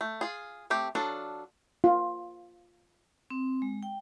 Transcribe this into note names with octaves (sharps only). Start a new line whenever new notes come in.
A3
F4 G#4
A3 C4 G4
F#3 D4 F4 A4
F4
C4
G#3
G5